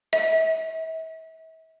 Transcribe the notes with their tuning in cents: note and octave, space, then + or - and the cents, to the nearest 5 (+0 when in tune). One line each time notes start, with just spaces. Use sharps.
E5 -40